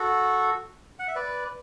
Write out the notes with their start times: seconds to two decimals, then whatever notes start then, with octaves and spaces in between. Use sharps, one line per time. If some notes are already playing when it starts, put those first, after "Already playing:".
Already playing: F#4 A4
0.99 F#5
1.08 E5
1.16 B4 D5